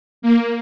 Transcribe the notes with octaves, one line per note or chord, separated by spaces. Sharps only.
A#3